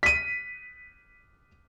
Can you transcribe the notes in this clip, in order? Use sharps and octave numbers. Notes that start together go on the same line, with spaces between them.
B6 D#7